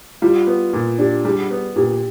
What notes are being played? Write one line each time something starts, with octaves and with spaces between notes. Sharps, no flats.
G3 F4
B3
A#2
D4 G4
G3 G#4
B3
A#2 G4